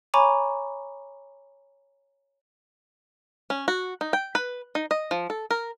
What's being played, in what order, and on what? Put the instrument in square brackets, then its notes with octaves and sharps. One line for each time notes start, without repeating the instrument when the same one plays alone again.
[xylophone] C#5 G#5 A#5 B5 C#6 D6
[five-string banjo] C#4
F#4
D#4
G5
B4
D#4
D#5
F3
A4
A#4